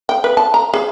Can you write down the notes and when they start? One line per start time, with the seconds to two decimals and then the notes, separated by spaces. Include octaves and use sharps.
0.09 G5
0.24 B4
0.37 A5
0.54 A#5
0.74 G#4